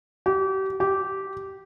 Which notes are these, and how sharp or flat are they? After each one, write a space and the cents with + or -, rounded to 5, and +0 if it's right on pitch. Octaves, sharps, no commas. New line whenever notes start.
G4 -35
G4 -15